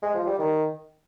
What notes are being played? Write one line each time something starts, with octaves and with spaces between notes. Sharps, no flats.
G#3
F3
G3
D#3